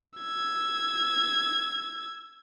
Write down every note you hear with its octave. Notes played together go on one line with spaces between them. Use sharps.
E6 G#6